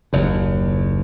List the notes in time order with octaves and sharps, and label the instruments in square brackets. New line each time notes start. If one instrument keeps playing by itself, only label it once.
[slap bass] F#1 D#2